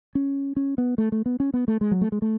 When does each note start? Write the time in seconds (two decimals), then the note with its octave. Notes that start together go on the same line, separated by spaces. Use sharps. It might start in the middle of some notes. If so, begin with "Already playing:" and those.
0.15 C#4
0.56 C#4
0.78 B3
0.98 A3
1.12 A3
1.26 B3
1.40 C#4
1.54 B3
1.68 A3
1.81 G#3
1.91 F#3
2.01 A3
2.12 G#3
2.22 A3